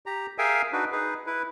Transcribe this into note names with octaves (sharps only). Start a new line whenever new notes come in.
G4 A#5
G#4 A#4 E5 F5 G5 G#5
D4 D#4 F#4 B4
D#4 G#4 B4
E4 B4